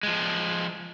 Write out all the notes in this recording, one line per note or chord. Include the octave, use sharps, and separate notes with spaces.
F3 G#3